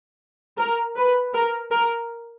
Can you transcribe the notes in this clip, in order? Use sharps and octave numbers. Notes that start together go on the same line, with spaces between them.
A#4
B4
A#4
A#4